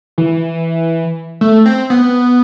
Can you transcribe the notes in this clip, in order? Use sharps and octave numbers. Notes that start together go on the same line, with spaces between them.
E3
A3
C4
B3